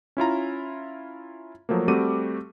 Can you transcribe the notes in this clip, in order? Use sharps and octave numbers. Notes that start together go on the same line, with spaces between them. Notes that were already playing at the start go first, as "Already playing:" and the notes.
C#4 E4 F4 A#5
F3 F#3 A3 A#3
G3 A3 C4 F#4 D6 D#7